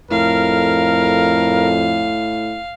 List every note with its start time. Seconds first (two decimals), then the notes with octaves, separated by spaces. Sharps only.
0.11 F2 A2 A#4 F5